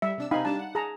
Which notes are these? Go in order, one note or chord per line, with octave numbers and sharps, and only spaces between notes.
G3 E5
C3 D4 E6
C3 C4 D#4 F5 G#5 B5
G3 D4 A5
F#5
G#4 A5 A#5